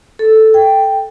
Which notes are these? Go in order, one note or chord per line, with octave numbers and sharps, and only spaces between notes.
A4
G5